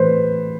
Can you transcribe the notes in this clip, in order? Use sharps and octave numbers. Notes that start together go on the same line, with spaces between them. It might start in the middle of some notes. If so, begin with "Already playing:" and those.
Already playing: A2 E3 B4 C5